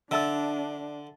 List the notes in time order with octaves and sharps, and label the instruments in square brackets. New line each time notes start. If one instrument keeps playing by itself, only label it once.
[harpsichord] D3 [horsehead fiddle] D4 [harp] E5 A5 E6